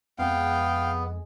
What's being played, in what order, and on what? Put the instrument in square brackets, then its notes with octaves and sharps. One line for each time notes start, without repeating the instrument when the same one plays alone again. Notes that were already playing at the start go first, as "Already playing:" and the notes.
[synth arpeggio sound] F2 G#3 [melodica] B3 [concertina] F5 [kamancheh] G5